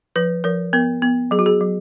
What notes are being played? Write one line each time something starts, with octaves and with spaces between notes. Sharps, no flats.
F3 B4
F3 A#4
B3 A#4
B3
F#3 G#4
F#4
G#4
F#3